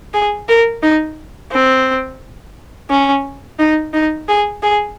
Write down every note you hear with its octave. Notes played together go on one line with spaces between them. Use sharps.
G#4
A#4
D#4
C4
C#4
D#4
D#4
G#4
G#4